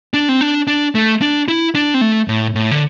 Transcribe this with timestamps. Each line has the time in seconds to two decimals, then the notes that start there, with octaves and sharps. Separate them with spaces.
0.14 D4
0.29 C4
0.41 D4
0.67 D4
0.95 A3
1.22 D4
1.48 E4
1.75 D4
1.94 C4
2.01 A3
2.28 A2
2.55 A2
2.71 D3